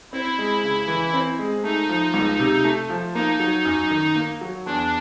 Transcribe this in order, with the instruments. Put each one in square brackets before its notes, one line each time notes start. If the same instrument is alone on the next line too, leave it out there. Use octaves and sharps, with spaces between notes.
[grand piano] C4 [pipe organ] E4
[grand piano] G#3
C#3
E3
C4
G#3
[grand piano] A3 [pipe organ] D#4
[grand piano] F3
C#2
C3
A3
F3
[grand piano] A#3 [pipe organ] D#4
[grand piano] F#3
F#2
D#3
A#3
F#3
[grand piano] E2 [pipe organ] D4